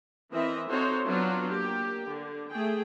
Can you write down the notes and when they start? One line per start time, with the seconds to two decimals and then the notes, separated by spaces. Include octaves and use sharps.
0.32 E3 C4 A#4 D#5 E5
0.69 C4 D#4 F#4 A4 C5 C#5
1.06 F#3 B3 D4 F4 F#4
1.48 A#3 G4
2.07 D3
2.51 A3 G#4 G5